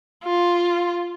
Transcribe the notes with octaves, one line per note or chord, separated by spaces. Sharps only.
F4